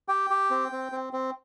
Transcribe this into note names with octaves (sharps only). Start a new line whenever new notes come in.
G4 G5
G4
C4
C4
C4
C4